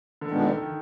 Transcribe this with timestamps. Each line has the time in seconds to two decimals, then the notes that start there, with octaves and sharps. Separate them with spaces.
0.21 D3
0.31 A#2 D#3 G#3 B3 D4
0.41 D3
0.51 D3
0.62 D#3